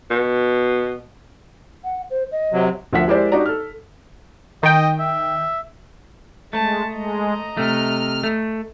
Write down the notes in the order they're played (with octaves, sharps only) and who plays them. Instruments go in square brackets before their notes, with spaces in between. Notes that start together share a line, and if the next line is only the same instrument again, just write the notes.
[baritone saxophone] B2
[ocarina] F#5
C5
D#5
[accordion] C3 F#3
[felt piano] D2 F3 A#4 E5 F#5 B6
G#3 E4 G4 A#4 C5 D5
D4 D#4 F#4 G4 D5 A#5
A4 F6
[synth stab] D#3 G5 [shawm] D#5
[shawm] E5
[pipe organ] G#3 [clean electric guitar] A3 [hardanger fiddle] A5
[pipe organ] G#3 [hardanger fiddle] D#5 A#5
[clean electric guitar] C3 A3 [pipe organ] F6
[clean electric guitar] A3